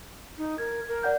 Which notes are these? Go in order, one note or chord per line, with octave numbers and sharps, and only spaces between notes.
D#4
A#4 G#6
A#4
D5 F#5 G6